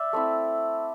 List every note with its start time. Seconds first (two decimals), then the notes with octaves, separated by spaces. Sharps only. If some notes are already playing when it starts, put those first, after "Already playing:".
Already playing: D5 E5
0.13 A3 C4 E4